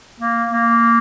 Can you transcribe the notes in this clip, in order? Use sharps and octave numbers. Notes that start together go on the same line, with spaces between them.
A#3
A#3